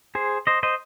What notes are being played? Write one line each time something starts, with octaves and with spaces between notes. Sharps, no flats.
G#4 C5
C5 D#5
C5 D#5